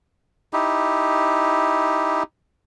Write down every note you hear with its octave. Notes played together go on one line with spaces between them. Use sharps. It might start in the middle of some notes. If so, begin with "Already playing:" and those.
D#4 E4 G4